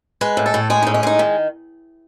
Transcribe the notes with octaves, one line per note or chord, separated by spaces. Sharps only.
G#3 B4
A2
A4
A2
G#3 G#4
A2 D#4
C#4
G#3 D#4
D#3